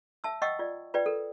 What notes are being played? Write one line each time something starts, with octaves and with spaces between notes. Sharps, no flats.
E5 A5 E6
D#5 F#5 G5 C#6 D#6 E6
F4 D5
F4 B4 D5 G5
A4 A#4